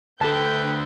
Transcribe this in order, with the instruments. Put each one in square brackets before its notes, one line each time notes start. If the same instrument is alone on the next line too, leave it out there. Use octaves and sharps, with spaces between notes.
[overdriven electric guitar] D2 D3 [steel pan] A4 A5 [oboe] B4 [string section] G5 G6